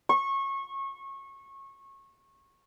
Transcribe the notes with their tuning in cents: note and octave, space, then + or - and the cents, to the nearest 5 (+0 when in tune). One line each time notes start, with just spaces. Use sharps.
C#6 -25